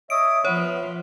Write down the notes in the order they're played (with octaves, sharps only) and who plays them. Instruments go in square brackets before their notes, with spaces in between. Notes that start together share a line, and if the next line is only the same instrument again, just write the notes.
[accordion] C#5 D#5 E5 [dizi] D#6 [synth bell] D7
[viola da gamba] F3 [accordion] B3 [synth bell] C#5 [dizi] E5